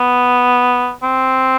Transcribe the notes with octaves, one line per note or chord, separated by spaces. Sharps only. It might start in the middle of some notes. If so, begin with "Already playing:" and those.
Already playing: B3
C4